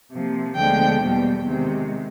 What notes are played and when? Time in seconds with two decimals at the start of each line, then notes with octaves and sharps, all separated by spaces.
0.12 C3 F3 A#3
0.56 D2 D3 F3 G#3 B3 G5
1.01 E2 B2 G3 A#3
1.46 C3 D#3 G#3